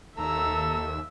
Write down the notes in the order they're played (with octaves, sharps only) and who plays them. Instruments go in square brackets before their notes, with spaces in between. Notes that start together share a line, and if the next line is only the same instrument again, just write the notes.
[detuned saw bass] D#2 [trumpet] A4 [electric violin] E5 E6 [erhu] A#5